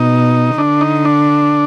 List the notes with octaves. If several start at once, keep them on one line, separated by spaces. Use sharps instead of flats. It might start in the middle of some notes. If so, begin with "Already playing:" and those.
Already playing: B2 D#4
D3 D4
D#4
D4